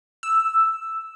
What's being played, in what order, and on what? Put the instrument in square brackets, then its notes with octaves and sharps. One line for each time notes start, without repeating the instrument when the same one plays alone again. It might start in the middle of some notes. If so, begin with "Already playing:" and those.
[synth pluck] E6